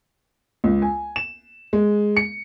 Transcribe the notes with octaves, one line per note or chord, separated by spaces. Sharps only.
C#2
G#5
E7
G#3
C#7